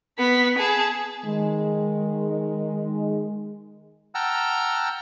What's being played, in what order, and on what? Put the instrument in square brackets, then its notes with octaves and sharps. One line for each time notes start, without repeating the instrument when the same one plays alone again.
[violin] B3 B6
G#4 A5
[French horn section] D#3 G#3
[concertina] F#5 G5 A5 A#5 E6 F6